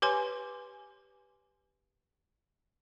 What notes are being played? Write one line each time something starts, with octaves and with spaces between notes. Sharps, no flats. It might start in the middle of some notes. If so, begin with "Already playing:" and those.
G4 B4 C#5 G#5 C6